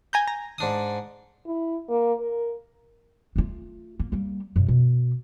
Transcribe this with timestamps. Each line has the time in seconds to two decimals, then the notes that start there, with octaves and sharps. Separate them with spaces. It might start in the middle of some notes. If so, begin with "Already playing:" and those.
0.13 G#5 A#5 G6
0.27 A#5
0.58 G#2 D4 D#6
1.46 E4
1.89 A#3
2.20 A#4
3.36 A3 F4
4.00 A#3
4.12 G3 A#3
4.56 F#2 B2
4.68 B2